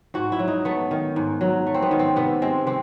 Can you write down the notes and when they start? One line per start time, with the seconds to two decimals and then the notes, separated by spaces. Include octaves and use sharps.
0.14 G#2 F#4
0.32 E4
0.39 F#3
0.48 D#4
0.65 A3 B3
0.91 D#3
1.16 G#2
1.41 F#3
1.66 A3
1.74 C4
1.82 B3
1.91 D#3
1.99 C4
2.16 C3 B3
2.42 G#3 C4
2.67 C3 C4